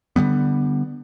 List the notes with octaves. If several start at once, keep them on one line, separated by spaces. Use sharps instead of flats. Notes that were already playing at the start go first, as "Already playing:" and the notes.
D3 D#3 G3 B3